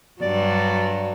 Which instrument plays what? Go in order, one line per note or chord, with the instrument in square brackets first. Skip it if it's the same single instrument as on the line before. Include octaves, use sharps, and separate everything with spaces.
[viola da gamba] G2 F#3 [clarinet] D5